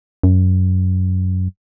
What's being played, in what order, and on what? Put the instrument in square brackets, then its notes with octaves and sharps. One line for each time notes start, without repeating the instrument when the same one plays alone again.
[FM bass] F#2